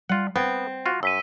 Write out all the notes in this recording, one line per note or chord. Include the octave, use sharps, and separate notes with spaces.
G3 F4 F#5
B3 C4 F#5
F4 F#4
F#2 E6 B6 D#7